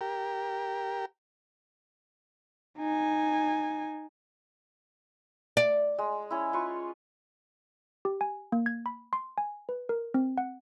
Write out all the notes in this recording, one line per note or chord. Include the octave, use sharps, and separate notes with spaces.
G4 A#4
D#4 G#5
D5
G#3
C#4 E4
F4 B4 C#6
G4
G#5
A#3
G#6
B5
C6
G#5
B4
A#4
C4
F#5